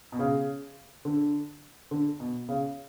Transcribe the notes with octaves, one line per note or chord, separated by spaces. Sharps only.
B2
C#3
D3
D3
B2
C#3